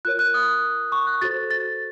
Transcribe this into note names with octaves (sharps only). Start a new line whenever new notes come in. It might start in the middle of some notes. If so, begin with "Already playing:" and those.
F4 A#4 C#5 F#6
F#6
D#6
C#6
F#6
F#4 A4 C5 A6
A6